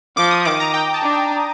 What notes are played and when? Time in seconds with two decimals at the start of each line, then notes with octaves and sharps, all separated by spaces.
0.17 F3 D6
0.31 D#6
0.45 D#3 D6
0.60 A#5
0.74 G5
0.94 A5
1.03 D4
1.13 G5